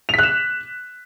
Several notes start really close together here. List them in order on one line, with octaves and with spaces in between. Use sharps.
F7 B6 F#6 E7